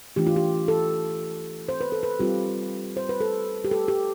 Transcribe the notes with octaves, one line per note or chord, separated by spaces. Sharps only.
E3 A3 D4 F4 G4
F4
G4
A4
C5
B4
A4
B4
G3 C4 F4 G4
C5
B4
A4
G4
A4
G4